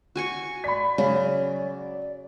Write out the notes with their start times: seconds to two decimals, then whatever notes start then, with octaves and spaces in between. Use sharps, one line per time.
0.16 F#4 G#5 C#6
0.64 D5 B5 B6
0.98 C#3 F#3